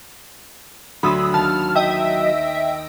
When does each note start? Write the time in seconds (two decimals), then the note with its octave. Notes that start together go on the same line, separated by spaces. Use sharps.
1.03 D2 F#3 B5 C6 D#6 E6 A6
1.34 D#2 A5 F6
1.75 D#5 E5 G5 E6